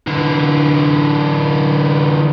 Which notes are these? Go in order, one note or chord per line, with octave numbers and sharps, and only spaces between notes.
D3 E3